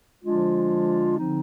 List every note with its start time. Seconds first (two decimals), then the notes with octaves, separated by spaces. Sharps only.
0.24 D3 F3 G#3 D4 F4
1.18 D3 F3 C4 D#4